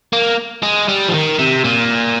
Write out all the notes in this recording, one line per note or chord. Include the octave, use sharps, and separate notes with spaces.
A#3
G#3
G3
F3
D#3
C3
A#2